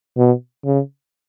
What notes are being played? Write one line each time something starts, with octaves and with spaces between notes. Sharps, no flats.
B2
C#3